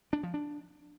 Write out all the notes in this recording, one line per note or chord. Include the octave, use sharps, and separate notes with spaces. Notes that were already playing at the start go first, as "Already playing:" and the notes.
D4
F3
D4